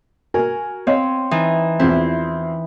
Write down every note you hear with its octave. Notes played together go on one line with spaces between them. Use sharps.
F#4 A#4 G#5
C4 C#5 D#5 F5
E3 D#4
E2 F3 C4 E4